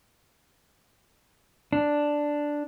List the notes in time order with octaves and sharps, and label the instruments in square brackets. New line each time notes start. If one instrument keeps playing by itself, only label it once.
[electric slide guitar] D4